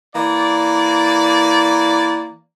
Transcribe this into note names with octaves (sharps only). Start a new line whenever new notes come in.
E3 A#3 D5